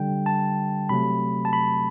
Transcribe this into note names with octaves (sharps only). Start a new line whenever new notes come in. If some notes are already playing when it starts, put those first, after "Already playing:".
Already playing: D3 G3 G5
A5
C3 F#3 A3 B5
A5
B5